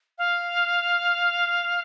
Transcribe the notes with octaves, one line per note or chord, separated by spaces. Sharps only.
F5